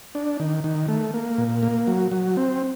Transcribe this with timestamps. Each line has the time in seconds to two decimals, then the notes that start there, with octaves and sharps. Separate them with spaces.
0.15 D4
0.40 D#3
0.64 D#3
0.89 A3
1.14 A#3
1.38 A#2
1.63 A#3
1.88 F#3
2.12 F#3
2.37 C4